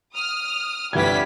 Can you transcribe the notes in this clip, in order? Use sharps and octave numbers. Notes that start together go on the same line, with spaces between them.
D#6 F6
G1 C2 G3 G#6 B6